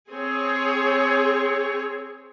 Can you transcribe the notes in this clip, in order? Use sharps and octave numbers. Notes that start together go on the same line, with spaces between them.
C4 G#4 C#5